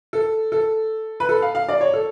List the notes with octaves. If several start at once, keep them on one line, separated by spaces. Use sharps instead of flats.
A4
A4
B4
A4
F5
F5
D5
C#5
A4